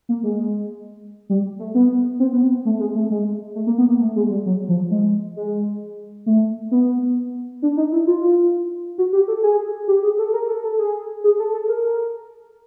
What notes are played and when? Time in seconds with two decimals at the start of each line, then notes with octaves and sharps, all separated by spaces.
0.09 A#3
0.23 G#3
1.30 G3
1.59 A3
1.75 B3
2.20 C4
2.33 B3
2.43 C4
2.65 A3
2.80 G#3
2.95 A3
3.10 G#3
3.55 A3
3.67 A#3
3.78 B3
3.89 A#3
4.00 A3
4.16 G#3
4.30 G3
4.46 F#3
4.69 F3
4.91 G#3
5.36 G#3
6.26 A3
6.71 B3
7.62 D4
7.77 D#4
7.92 E4
8.07 F4
8.98 F#4
9.13 G4
9.28 A4
9.43 G#4
9.88 G4
10.03 G#4
10.18 A4
10.33 A#4
10.48 A4
10.64 A4
10.78 G#4
11.24 G#4
11.39 A4
11.54 A4
11.69 A#4